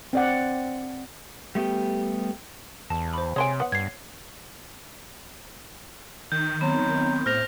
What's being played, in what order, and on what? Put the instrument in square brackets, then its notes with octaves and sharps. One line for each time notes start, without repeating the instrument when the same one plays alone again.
[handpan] C4 D5 F#5
[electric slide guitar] G3 A3 B3 G4
[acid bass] E2 [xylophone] A5
[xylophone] C5 B5
[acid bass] C3 [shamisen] G#3 A4 G#5 [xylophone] C#5 C6 D7
[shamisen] B3 F#5
[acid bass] G2 [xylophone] G#6 C7
[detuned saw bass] D#3 [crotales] G6
[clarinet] F#3 [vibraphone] B3 C4
[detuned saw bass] A2 [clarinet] C5 [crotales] F6 A#6 F7